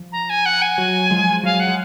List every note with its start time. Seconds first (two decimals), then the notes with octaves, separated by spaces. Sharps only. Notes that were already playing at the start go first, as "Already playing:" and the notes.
Already playing: F3
0.12 A#5
0.29 G#5
0.46 F#5
0.62 G#5
0.78 F#3
1.11 F3 G#3
1.44 F#3 F5
1.60 F#5
1.67 G#3